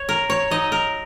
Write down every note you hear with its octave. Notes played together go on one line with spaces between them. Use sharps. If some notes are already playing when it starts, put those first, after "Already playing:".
Already playing: C#5
A#4
C#5
F#3 D#4 D#5
A#4